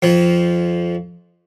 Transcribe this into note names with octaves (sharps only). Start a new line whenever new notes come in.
F2 F3